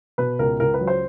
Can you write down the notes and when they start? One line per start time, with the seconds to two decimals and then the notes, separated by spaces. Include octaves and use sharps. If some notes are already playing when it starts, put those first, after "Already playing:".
0.18 B2 B4
0.39 C#2 A#4
0.60 C#2 A#4
0.74 B4
0.81 F#3
0.87 C5